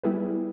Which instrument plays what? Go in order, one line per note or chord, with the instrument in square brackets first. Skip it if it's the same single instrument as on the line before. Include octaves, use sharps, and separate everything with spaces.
[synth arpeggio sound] G3 B3 E4 G#4 B4